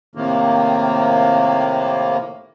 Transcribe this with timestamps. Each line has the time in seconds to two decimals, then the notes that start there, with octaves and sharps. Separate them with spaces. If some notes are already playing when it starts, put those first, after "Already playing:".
0.15 A2 C3 D#3 A#3